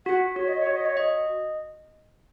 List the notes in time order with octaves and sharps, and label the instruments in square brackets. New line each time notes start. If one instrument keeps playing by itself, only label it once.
[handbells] F#4 [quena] F#5
[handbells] F#4 [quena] C#5
[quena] D#5
C#5
[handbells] F#4
[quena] D#5
C#5
[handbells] D#5